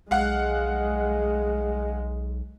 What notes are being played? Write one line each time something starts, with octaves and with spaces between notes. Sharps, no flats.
B1 G#3 F5 F#5